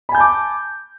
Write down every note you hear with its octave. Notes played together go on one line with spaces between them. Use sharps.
G#5 A5 B5 D6 G6